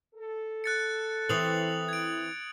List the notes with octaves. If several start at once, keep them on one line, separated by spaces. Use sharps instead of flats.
A4
F#6 A6 C#7
E3 C4 D#6 F7 F#7
G#6 D7